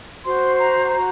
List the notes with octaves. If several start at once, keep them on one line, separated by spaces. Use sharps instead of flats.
F#4 C5 C6
A#5
F#4 A#5